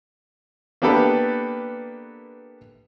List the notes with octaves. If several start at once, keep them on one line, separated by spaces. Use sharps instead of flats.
A#3 B3 D4 G4 A4 B4